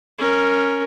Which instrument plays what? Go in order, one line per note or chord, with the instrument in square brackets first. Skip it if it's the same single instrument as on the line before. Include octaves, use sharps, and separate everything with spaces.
[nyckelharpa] C#4 A#4